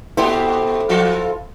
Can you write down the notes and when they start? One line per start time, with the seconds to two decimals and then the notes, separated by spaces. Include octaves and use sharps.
0.17 A#2 E4 G4 A4 C5
0.89 F3 F4 A4